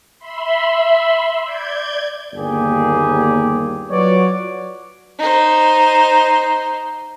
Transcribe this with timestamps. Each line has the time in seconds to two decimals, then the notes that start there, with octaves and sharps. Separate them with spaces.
0.18 E5 B5 C6
1.45 D5 G6 G#6
2.34 G1 D#2 G3 A#3 G4 G#4
3.90 F#3 F4 F#4 B4 C#5 D5
5.19 D#4 C5